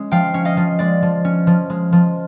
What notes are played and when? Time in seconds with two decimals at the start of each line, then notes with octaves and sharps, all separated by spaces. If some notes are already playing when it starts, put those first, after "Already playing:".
Already playing: G#3 C#4
0.11 F3 F5 G5
0.34 C#4
0.45 D#5 F5
0.57 F3
0.79 G#3 D5
1.02 F3
1.25 C#4
1.47 F3
1.70 G#3
1.92 F3